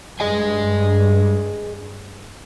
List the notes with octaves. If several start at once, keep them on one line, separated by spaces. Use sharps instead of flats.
G2 G#4 D#5 G#5